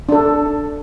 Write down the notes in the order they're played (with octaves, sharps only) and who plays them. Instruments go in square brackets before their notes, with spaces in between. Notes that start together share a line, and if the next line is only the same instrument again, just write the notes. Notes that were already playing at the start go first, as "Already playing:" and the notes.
[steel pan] D4 A4